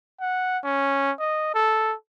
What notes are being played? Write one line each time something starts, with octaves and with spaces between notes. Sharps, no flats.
F#5
C#4
D#5
A4